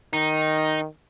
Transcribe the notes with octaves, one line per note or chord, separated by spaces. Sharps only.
D#3 D#4